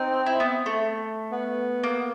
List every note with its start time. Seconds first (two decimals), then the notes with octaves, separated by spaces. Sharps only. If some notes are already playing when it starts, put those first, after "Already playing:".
Already playing: C4 D#4
0.26 E4
0.40 B3
0.66 A3
1.31 B3
1.83 A#3